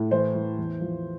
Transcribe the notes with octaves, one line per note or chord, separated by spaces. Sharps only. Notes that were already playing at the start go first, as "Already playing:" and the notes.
Already playing: A2
E3 C5
E3
E2
F3